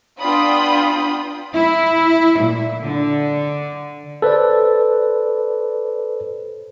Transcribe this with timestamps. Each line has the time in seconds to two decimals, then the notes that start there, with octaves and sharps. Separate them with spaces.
0.20 B3 D4 F4 G5 B5 D#6
1.55 E4
2.38 A#2
2.83 D3
4.22 A4 B4 C5 D5